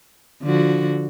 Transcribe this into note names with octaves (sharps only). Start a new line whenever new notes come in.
D3 F3 F#4